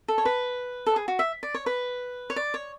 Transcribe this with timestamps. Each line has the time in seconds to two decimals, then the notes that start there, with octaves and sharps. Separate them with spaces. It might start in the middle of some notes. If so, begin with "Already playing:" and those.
0.08 A4
0.18 C#5
0.25 B4
0.86 A4
0.96 G#4
1.08 F#4
1.19 E5
1.43 D5
1.54 C#5
1.66 B4
2.30 C#5
2.36 D5
2.54 C#5